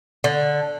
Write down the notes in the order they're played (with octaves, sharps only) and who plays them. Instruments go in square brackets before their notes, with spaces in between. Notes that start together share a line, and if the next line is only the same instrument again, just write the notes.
[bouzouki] D3